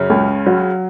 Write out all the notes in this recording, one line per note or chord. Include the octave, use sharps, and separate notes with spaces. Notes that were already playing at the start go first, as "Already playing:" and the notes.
Already playing: F#2 C#3 C#4
C#2
F#3